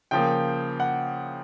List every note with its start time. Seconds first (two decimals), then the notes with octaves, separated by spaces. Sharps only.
0.11 C#3 F3 A#3 G5
0.80 F#5